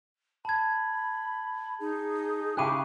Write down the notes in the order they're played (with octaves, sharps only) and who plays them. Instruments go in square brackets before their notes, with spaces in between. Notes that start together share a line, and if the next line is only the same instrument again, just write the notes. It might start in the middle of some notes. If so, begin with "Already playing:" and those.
[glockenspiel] A5 G#6 [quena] B5
[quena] D#4 [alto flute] G#4
[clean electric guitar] C#3 E4 G4 [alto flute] F5 [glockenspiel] F#6 D#7